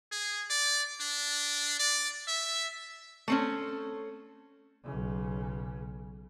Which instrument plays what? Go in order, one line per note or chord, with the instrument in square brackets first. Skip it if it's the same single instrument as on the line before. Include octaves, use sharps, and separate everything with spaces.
[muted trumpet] G#4
D5
D4
D5
E5
[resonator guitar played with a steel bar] A3 C4 C#4
[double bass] B1 C#3